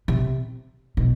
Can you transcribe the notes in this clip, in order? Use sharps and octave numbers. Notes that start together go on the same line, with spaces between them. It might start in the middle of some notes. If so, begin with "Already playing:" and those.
C3
B2